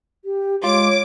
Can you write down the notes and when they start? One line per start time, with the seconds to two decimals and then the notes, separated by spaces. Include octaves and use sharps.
0.25 G4
0.64 G#3 F4 C#5 D6